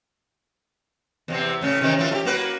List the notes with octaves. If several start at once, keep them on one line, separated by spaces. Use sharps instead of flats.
E2 C3 C4
A2 C#3 C#4
C3 D#3 E3
E3 B3 F4
A3 G4
A#3 F#4 B4